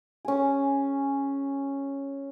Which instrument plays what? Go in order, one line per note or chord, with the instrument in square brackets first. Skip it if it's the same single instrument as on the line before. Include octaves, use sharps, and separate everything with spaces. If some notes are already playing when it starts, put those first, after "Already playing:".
[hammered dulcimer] C#4 G#4